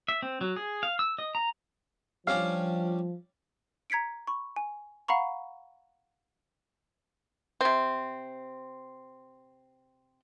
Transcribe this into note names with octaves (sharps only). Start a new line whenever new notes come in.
E5
C4
F#3
G#4
F5
E6
D#5
A#5
F3 G3 C#4 D4 F5
A#5 G#6 B6 C#7 D7
B5 C#6
G#5
F5 F#5 A#5 B5 C#6
C3 C4